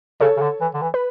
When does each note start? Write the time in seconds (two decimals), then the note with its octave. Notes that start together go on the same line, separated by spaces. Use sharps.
0.21 C#3 A4 C#5
0.37 C#3
0.41 D3
0.61 E3
0.74 D3
0.81 E3
0.94 B4